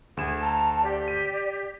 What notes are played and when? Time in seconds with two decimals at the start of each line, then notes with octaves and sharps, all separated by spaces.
0.17 D2 G#4 E7
0.41 A5 A#5
0.83 G4 D5
1.08 D#7